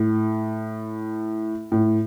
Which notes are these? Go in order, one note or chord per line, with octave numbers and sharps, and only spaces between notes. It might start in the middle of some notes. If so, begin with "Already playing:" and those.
Already playing: A2
A2